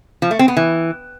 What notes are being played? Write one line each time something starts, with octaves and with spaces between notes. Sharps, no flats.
F3
A3
C4
B3
E3